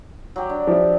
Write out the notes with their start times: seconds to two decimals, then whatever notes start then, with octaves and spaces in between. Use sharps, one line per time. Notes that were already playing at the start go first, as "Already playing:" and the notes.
0.36 F#3 G4
0.49 D4
0.67 F3 E4 G4